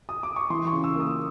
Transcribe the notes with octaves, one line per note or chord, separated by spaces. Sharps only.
D#6
D6
C#6
E3 C6
C#6
C#3
E6
A#3 D#6